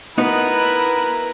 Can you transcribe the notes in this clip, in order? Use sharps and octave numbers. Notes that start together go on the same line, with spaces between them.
B3 D#4 E4 F#4 A#4 B4